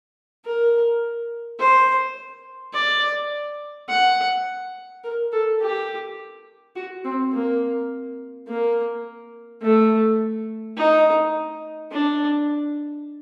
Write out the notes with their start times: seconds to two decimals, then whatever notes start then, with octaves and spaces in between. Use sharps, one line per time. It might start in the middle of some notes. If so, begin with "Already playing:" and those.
0.45 A#4
1.59 C5
2.74 D5
3.89 F#5
5.04 A#4
5.32 A4
5.61 G4
6.76 F#4
7.04 C4
7.33 A#3
8.48 A#3
9.62 A3
10.77 D#4
11.92 D4